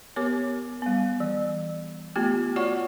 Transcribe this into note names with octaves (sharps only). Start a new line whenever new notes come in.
B3 G4 A#4 C#5 D6
G3 B3
E3
A3 B3 F4 G4
F4 F#4 C#5 D5 F#5 C#6